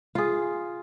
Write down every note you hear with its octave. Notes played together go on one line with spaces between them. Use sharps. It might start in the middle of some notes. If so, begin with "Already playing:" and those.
F4 G#4